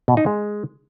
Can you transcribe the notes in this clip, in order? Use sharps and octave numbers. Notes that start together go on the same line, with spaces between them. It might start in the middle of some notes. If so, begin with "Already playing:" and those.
B2
D#4
G#3